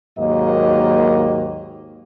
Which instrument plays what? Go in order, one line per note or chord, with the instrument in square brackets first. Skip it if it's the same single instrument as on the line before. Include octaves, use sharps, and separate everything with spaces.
[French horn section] D#2 G#2 F#3 A#3 D#5